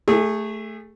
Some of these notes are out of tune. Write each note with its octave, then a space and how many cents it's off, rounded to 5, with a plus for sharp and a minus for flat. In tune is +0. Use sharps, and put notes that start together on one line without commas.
A3 +0 G#4 -30